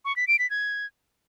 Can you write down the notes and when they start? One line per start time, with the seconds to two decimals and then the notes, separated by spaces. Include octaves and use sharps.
0.05 C#6
0.16 B6
0.28 D7
0.39 B6
0.50 G#6